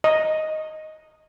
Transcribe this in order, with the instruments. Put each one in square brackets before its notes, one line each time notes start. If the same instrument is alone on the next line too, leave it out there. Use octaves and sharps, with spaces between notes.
[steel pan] D#5